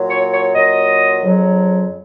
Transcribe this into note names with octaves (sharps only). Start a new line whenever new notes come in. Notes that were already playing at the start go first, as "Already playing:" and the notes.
Already playing: A#2 F#3
C#5
C#5
A#2 F#3 D#5
F2 C#3 F#3